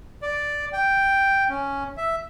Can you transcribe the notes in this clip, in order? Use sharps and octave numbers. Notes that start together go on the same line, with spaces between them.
D5
G5
C#4
E5